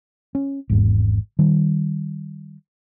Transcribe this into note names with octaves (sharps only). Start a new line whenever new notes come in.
C#4
G#1 E2 G#2
D#3 G3